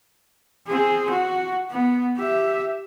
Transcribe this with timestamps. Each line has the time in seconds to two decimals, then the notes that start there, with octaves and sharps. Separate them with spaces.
0.67 C4 G#4
1.10 F#4
1.71 B3
2.16 G4 E5